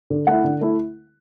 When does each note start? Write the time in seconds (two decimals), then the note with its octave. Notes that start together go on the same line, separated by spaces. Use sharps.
0.10 D3
0.27 A3 E4 F#5
0.44 D3
0.61 A3 E4